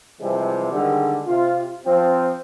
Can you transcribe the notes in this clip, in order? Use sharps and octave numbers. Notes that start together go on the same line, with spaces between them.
C3 E3 F3 G3 G#3
D3 D#3 G3 G#3
C3 F4
F3 C4